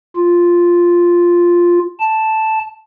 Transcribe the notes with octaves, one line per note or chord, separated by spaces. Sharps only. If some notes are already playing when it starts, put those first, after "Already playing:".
F4
A5